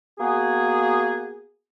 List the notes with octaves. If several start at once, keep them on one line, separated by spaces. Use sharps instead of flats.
A#3 B3 F#4 G#4